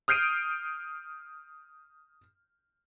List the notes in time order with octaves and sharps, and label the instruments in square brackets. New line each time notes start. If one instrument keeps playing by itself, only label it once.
[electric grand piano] D#6 F6 G6 C7 D7 D#7